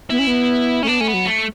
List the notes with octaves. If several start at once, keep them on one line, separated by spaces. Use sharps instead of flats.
B3 E4
C#4
B3
A3 C#4
B3 D4
A3 C#4
B3
F#3
A3